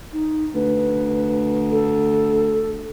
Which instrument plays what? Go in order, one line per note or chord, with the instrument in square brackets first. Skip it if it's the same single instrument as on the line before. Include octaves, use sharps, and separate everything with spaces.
[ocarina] D#4
[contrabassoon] D2 [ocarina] B4
[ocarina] A4